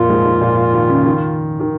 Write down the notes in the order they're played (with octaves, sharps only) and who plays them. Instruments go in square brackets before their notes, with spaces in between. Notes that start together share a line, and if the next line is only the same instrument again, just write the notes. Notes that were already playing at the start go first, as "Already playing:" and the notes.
Already playing: [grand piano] F2 A#2 F3 A#3 [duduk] F4
[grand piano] G#2 G#3
G#2 G#3
A#2 A#3
D#3
C#3
D#3
D#3